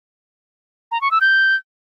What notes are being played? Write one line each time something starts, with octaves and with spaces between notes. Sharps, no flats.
A#5
C#6
E6
G6